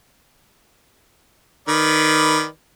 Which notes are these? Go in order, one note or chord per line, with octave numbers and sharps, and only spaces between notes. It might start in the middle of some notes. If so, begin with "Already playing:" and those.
D#3 B4 D5